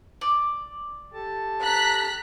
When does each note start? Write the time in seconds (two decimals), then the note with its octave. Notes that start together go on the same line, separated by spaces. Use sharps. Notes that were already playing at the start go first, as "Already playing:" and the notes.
0.21 D5
1.13 G4 A4 A5
1.63 A#5 F#6 B6